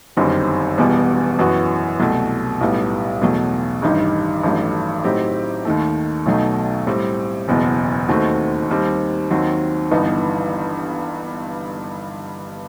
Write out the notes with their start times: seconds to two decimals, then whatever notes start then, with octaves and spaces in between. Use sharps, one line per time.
0.17 G1 F#2 D#3 G3 C4
0.78 E1 E2 B2 G3 B3
1.39 F#2 E3 B3 F#4
2.00 C2 B2 F#3 A3
2.61 B1 A2 G3 B3
3.21 E2 B2 F#3 A3
3.82 A1 G2 D#3 G3 D#4
4.43 A1 G2 D#3 F#3 A3
5.04 A2 F#3 C4 D#4 G4
5.65 D#2 D#3 A3
6.26 B1 B2 F#3 A3 D#4
6.87 A2 G3 C4
7.48 F#1 E2 B2
8.08 D#2 D#3 A3 C4 F#4
8.70 D#2 D#3 G3 C4
9.31 D#2 D#3 F#3 C4
9.91 G1 G2 E3 B3 D#4